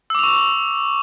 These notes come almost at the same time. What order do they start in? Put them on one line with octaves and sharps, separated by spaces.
E6 D6 F7 C#6